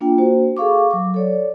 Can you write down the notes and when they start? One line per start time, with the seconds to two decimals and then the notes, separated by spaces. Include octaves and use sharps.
0.01 A#3 D4 F4 G5
0.18 A#3 F#4 C5
0.57 G#4 A4 F5 C#6 D6
0.91 F#3 D6
1.14 A4 C#5 D5